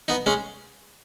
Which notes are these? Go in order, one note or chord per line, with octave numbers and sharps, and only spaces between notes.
B3 D#4
G#3 C#4